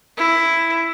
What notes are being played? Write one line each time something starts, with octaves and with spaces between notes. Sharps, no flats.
E4